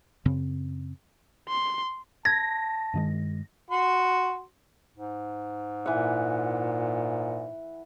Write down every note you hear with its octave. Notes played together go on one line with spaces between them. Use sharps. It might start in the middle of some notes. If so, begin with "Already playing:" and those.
F#2 C#3 C4
C6
A5 G#6 A#6
G2 D#3 G#3
F#4 C6
G#2
A#2 E3 F#5